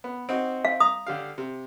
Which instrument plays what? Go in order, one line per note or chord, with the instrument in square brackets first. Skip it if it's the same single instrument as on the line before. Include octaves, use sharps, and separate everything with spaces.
[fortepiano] B3
C4 D#4 F#4
[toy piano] F5
[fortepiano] A#5 [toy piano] D#6
[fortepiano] D3 G4 F5
C3